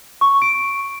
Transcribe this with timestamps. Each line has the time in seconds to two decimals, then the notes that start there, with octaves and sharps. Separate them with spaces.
0.21 C#6
0.42 D7